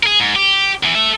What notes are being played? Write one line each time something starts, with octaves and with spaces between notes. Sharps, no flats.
G#4 A#4
G#2
G4
E2 E3
A4 E5